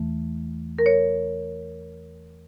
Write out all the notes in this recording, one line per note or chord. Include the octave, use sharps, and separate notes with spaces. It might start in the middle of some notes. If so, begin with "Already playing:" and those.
Already playing: E2 E3 A3
A#4
C#5